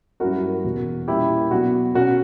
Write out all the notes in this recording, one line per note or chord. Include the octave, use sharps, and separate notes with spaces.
G2 F#3 C#4 E4 F#4 A#4
E2 B2 A#3
A#2 G3 A#3 C#4 E4 G4
B2 F#3 B3 D4 F#4
B2 A#3 C#4 F#4 A#4